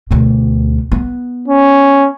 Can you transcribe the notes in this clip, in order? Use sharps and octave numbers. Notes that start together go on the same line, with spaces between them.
D2 B2
B3
C#4